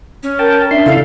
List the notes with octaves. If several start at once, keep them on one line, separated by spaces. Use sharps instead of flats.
C#4
A#4 G5 A5
D4 E5 C6
C#3 E4 A4 F5